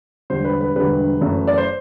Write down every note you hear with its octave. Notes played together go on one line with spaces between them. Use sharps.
E1 D2 D3 G3 C5
B4
B4
E1 D2 D3 G3 B4
F#1 F#2 E3 A3
D5
C5